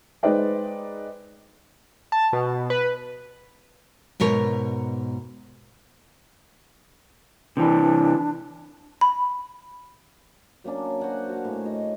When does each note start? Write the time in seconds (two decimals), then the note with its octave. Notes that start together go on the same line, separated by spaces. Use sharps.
0.23 G#3 D#4 B4 C5 D5 G5
2.12 A5
2.33 B2
2.70 B4
4.20 G#2 B2 A#4 C#5
7.57 C3 E3 D4
9.01 B5
10.64 F#3 A#3 C#4 D4
11.00 F#4 C5 F#5 G#5
11.29 F#4 F5
11.45 A2 G#5
11.65 F#4 D#5